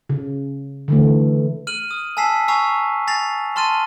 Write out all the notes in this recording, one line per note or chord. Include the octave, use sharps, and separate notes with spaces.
C#3
D3 E3 A3
F6 D#7 F#7
D#6
G#5 A5 E6 B6 C7
G#5 A#5 C#6 E6 C7
G#5 A6 A#6 C7 F7
A5 C6 F6 A6 D#7